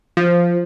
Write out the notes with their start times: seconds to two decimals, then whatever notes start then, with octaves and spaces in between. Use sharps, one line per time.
0.17 F3